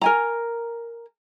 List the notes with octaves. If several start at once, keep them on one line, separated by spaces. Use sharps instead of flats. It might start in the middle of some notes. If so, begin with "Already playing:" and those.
A#4 G#5 A#5